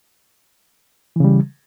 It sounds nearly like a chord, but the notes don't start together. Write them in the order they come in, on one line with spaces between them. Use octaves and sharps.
E3 C#3 G3